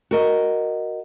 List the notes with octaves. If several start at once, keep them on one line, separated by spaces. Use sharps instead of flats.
F#4 A#4 D#5